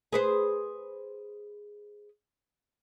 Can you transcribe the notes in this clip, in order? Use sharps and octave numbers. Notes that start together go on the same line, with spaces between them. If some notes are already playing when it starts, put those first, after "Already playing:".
G#4 B4 C5